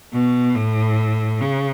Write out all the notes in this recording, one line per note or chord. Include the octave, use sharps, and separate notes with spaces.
B2
A2
C#3